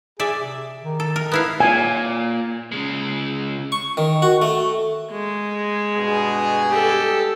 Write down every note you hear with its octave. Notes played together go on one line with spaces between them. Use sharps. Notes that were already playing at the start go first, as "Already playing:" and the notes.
G#4 D5 E5
C3
D#3
A4
A#4
B3 E4 F5
A#2 G#5
C#3 G#3
C#6
D#3
F#4
A3
G#3
G2 B2 G#4
G4 A4